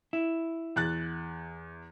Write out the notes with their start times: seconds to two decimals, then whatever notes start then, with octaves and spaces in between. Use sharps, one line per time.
0.13 E4
0.76 E2 F#6 A6